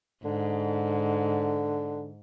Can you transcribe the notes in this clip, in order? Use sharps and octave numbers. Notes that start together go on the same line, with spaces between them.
G#2 D3